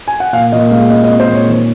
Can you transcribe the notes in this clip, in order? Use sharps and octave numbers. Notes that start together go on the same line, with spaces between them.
G#5
F#5
A#2 F5
A#2 D#5
G#3 F5
G#3 D#5
D#5
C4
C5
A#2
C#5
D#3